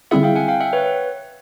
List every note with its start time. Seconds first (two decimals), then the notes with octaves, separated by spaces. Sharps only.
0.11 D3 G3 C4 E4 G#4 E5 F#5
0.23 F5 G5
0.36 F#5 G#5
0.48 F5 G5
0.61 E5 F#5
0.73 B4 C#5